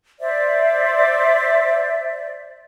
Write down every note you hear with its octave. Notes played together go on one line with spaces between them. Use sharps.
C5 D5 E5